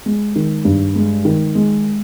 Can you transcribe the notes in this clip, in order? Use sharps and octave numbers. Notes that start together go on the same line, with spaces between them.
G#3
D#3
G2
G#3
D#3
G#3